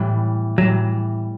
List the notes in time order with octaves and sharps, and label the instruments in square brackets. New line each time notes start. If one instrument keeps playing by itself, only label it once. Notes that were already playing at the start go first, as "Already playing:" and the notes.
Already playing: [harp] A2 E3 G3 B3
[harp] A2 E3 G3 [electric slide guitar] F#3